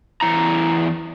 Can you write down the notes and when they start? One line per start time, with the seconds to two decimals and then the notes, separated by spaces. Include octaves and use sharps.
0.21 E2 C3 E4 A#5